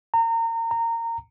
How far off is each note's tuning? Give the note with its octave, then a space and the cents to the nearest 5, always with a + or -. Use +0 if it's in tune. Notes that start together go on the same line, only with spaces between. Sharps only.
A#5 -30
A#5 -20